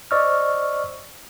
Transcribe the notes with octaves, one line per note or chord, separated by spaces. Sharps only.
C5 D5 D#5 C#6 E6 F6